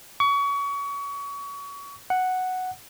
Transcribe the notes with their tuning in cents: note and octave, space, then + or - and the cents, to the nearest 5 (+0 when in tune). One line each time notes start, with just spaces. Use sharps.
C#6 +30
F#5 +0